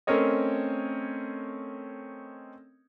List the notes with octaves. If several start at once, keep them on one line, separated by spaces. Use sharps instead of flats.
A3 C4 C#4 A#4 C#5 D#5